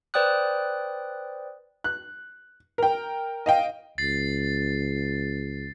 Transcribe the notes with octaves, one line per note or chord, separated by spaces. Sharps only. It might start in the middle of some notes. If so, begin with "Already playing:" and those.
B4 C5 D5 G5 D#6 F#6
F#6
A#4 G5
D#5 F5 G5
C#2 A6 C7